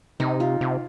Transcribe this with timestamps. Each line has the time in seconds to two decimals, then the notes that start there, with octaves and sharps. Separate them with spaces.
0.20 C3 D#4
0.40 F4
0.61 C3